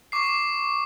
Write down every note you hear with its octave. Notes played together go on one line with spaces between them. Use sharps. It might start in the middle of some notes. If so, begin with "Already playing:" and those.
C#6 D6 C7